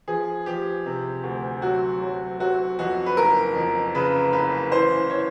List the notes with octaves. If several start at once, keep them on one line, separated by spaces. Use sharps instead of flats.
F3 G#4
F3 G4
C3
D2
F#3 F#4
F#3
F#3 F#4
F2 F#4
B4
F#1 A#4
F2
C#3 B4
F#1 B4
E3 C5
E3 C#5